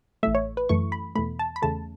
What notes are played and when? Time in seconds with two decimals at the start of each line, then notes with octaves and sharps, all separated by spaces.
0.23 A1 A2 A3 E5
0.35 C#5
0.57 B4
0.69 F#2 E3 A3 C#6
0.92 B5
1.15 E2 B2 A3 B5
1.39 A5
1.56 B5
1.62 E2 C#3 A3 A5